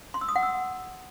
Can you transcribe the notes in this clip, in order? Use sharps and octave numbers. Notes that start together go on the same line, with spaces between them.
C6
E6
D#6
F#5
E6